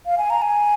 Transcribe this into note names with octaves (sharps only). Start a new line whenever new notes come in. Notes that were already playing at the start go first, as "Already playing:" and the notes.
F5
G#5
A#5
G#5